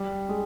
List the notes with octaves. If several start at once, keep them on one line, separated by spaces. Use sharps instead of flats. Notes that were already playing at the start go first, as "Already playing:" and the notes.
Already playing: G3
G#3